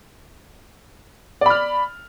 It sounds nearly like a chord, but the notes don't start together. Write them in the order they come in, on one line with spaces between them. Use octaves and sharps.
D5 B5 F6